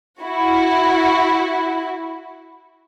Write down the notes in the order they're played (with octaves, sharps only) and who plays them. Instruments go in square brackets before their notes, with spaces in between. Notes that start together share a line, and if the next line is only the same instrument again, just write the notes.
[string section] E4 F#4